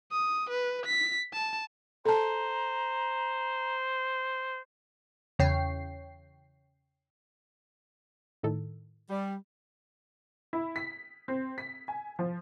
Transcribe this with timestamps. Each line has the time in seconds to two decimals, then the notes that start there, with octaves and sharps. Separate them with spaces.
0.12 D#6
0.50 B4
0.86 B6
1.33 A5
2.05 A4 C5 A5 A#5
5.39 E2 C#3 C#5 G5 C7
8.43 A2 D#3 A4
9.10 G3
10.53 E4
10.76 B6
11.28 C4
11.58 B6
11.88 G#5
12.19 F3